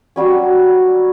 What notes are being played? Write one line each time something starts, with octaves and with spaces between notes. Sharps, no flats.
F#3 G3 C#4